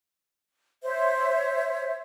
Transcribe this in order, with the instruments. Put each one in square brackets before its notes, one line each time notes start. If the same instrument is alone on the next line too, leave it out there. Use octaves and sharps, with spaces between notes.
[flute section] C5 C#5 E5